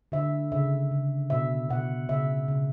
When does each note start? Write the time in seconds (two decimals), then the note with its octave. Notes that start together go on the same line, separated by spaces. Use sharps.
0.12 D3 E5
0.52 C#3 E5
0.91 C#3
1.30 B2 E5
1.69 B2 F#5
2.09 C#3 E5
2.48 C#3